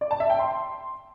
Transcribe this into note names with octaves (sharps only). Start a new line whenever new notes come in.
D5
A5
E5
G5
C6